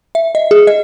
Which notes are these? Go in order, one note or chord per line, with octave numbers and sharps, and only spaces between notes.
E5
D#5
G#4
D#5